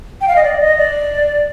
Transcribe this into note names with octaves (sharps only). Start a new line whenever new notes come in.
G5
F5
D#5
D5
D#5
D5